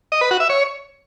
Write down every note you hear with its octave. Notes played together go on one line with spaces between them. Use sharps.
D#5
B4
F#4
E5
C#5